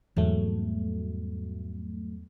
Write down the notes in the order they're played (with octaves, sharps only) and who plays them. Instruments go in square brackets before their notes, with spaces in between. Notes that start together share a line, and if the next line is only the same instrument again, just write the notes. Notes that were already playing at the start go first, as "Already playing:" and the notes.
[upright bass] E2 G3 [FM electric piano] G#2 F#3 A3